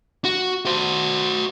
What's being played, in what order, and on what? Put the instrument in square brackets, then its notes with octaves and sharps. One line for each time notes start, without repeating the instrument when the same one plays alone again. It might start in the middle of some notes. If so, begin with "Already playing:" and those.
[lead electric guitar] F#4
F#4 C5